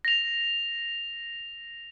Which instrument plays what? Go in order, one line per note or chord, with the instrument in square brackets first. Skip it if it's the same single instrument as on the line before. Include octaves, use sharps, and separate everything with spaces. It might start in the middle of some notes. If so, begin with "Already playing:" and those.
[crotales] A#6 F7